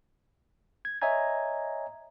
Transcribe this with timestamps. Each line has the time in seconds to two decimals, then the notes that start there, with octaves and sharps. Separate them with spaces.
0.85 G#6
1.02 C#5 D#5 E5 G#5 A#5 G#6